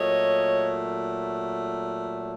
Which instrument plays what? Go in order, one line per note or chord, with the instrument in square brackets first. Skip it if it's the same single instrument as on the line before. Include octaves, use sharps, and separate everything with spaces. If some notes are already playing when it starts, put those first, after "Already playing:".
Already playing: [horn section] A#2 F#3 A3 C#5 D#5